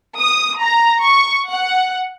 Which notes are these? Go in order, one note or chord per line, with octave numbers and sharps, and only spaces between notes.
D#6
A#5
C#6
F#5